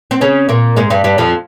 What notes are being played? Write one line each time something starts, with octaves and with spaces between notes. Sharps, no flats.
C4
C#3 C#4
A#2 A#3
G#2 G#3
G2 G3
G2 G3
F2 F3